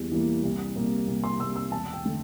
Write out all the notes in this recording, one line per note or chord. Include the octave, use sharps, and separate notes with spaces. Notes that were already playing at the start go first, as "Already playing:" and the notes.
Already playing: E2 E3 G3 A#3
E3 G3 A#3
C2
C3 G3 A#3
C2
C6
C3 G3 A#3 E6
E6
E1 A5
G5
D3 A3